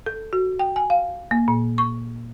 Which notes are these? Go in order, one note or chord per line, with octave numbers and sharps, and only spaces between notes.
A4
F#4
G5
G#5
F5
A#3
A#2
C#6